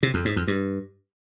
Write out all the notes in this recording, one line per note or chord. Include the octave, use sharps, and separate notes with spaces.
C3
F2
G#2
F2
G2